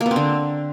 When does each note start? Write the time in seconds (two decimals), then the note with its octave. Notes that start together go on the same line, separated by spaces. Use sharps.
0.01 A#3
0.06 B3
0.11 C4
0.16 D3